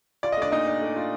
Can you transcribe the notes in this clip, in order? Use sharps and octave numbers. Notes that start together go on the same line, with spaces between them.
F4 D5
D#5
A3 D4 D5
A#2 D#4 D#5
D4
A3
F4